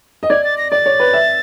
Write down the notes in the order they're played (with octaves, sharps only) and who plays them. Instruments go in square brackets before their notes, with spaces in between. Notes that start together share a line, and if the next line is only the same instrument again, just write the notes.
[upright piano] D#5
[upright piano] D5 [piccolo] G#6
[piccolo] A6
A#6
[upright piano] D5 [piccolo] A6
[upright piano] C#5
B4
E5